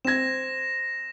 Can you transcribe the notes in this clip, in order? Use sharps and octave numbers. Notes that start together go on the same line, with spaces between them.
C4 G#6 A#6 E7